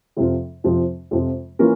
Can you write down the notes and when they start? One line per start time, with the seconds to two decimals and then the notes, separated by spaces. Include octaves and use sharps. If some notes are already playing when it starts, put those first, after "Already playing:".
0.17 F2 C3 F3 C4 F4
0.64 F2 C3 F3 C4 F4
1.11 F2 C3 F3 C4 F4
1.59 E3 A#3 C#4 F4 A#4